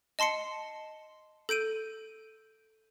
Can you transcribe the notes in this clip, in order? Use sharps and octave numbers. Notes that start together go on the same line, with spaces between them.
D#5 A5 C6 C7 C#7
A4 G6 D7 D#7